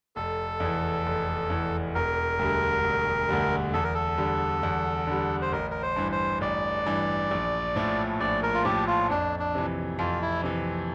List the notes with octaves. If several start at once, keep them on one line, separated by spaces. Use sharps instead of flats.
F1 A4
E2
E3
F1
E2 E3
E1 A#4
D2 D3 G3
E1
D2 D3 G3
E2 A4
A#4
A4
D3 G3
E2
D3 G3
C5
A1 A#4
A#4
C5
G2 E3
C5
A1 D5
G2 E3
A#1
A2 F3 A3
A#1 D5
A#4
F4
A2 F3 A3 G4
F4
F2 D4
D4
C3 E3
F2 F4
E4
C3 E3